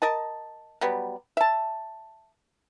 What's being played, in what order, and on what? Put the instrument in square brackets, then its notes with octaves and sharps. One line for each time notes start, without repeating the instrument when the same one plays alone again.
[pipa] A#4 D#5 A5
F#3 G3 B3
E5 A5